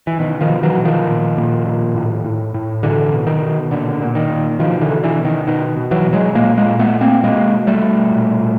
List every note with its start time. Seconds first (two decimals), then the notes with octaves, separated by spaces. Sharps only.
0.07 E3
0.19 B2 D#3
0.41 D#3 F3
0.49 B2
0.63 E3 F#3
0.78 B2
0.85 D#3 F3
1.07 A#2
1.37 A#2
1.66 A#2
1.95 A2
2.25 A2
2.54 A2
2.83 B2 D3 E3
3.12 B2
3.27 D#3
3.42 B2
3.71 A#2 D3
4.00 A#2
4.15 D#3
4.29 A#2
4.59 B2 D#3 F3
4.81 D3 E3
4.88 B2
5.03 D3 E3
5.18 B2
5.25 D#3
5.47 B2 D#3
5.77 B2
5.91 E3 F#3
6.06 B2
6.13 F#3 G#3
6.35 A#2 G#3 A#3
6.57 G#3 A#3
6.65 A#2
6.79 A3 B3
6.95 A#2
7.01 A#3 C4
7.23 B2 G#3 A#3
7.53 B2
7.67 G3 A3
7.82 B2
8.11 A#2
8.40 A#2